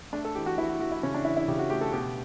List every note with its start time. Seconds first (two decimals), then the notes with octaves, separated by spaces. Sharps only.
0.13 A3 D4
0.25 A4
0.35 E3 G4
0.46 F#4
0.58 E3 E4
0.69 F#4
0.80 E3 F#4
0.92 E4
1.03 C#3 C#4
1.14 D4
1.25 E3 E4
1.36 E4
1.48 C#3 G4
1.59 F#4
1.70 A3 G4
1.81 A4
1.92 B2 G4